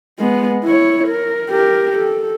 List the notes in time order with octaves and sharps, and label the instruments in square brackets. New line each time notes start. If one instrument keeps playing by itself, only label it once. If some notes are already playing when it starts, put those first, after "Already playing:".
[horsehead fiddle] G#3 B3
E4 C#5
A#4
G4 A#4
A4